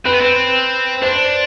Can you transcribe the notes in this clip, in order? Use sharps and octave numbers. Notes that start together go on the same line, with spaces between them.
C4 B4
B3
C4
D4 C5